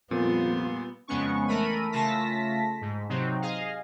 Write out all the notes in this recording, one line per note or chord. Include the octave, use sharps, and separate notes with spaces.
F2 A#2 G3 A#3 B3 F4
F2 C#3 G#3 B3 C#4 C#6
E3 A3 A#4 B5 D#7
C#3 A3 F4 A5 A#6 B6
G#2
C3 F#3 C4 D#4
G#4 D#5 F5